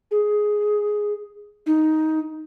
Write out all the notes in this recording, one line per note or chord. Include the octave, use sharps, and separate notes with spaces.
G#4
D#4